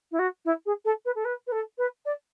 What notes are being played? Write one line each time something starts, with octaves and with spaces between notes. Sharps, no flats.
E4
F#4
E4
G#4
A4
B4
A4
B4
B4
A4
B4
D5